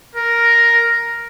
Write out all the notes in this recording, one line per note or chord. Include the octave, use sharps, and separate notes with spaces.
A#4